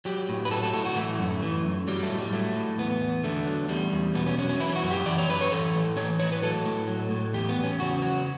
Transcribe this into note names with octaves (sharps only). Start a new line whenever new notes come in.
F#3 G4
A2
B4
F#3 A4
A4
A2 A4
F#4
E3 A3
F#2
E3
F#2
F#3 G3
A3
A2
G3
F#3 A3
A2
E2 B3
E2
D3 A3
F#3
E2 G3
E2
B2 B3
C#4
F#3 C#4
C#4
E3 E4
F#4
F#2
G4
E3 D5
C#5
F#2 B4
C#5
E3 A4
A2
E3 C#5
A2 C#5
B4
F#3 A4
A2
F#3
A2
E2 G4
B3
E2
C#4
C#3 F#4
F#3